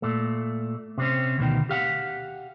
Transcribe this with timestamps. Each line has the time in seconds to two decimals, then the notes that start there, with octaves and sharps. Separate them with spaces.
0.02 A#2 A3
0.98 C3 C4 C#4
1.38 D2 B2 D#3
1.69 G4 F5 F#5